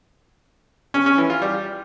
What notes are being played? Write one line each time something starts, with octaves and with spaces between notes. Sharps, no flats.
C#4
C#4
E3
F4
G3